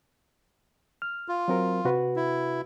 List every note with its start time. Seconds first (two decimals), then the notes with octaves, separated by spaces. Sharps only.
1.02 F6
1.28 F4
1.48 F#3 C4 A#4
1.85 C3 F#4 B4
2.16 E4